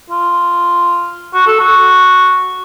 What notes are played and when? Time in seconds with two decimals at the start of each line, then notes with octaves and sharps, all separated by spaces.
0.10 F4
1.34 F#4
1.47 A4
1.60 F#4